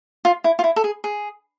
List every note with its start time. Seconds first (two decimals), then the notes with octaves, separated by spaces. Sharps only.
0.25 F4
0.44 E4
0.59 F4
0.64 E4
0.76 A4
0.84 G#4
1.04 G#4